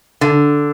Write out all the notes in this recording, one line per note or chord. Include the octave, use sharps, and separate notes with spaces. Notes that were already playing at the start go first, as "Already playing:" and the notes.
D3